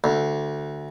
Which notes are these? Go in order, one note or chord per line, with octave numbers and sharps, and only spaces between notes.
D2